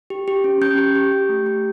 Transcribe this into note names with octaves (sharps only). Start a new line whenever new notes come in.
G4
G4
C#4
C#4 G6
G4
G4
G4
A3
G4